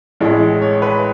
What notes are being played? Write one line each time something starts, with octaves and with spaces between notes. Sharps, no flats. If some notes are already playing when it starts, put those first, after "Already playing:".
A1 A2 G#3
C#5
B4